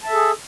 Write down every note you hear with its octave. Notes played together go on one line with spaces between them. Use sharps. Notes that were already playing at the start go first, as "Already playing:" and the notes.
G#4 A4 E5 A5